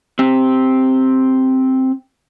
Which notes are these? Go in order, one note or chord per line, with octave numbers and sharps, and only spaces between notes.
C4 G4